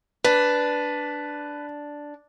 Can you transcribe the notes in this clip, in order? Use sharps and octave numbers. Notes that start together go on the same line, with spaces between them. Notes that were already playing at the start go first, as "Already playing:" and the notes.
D4 B4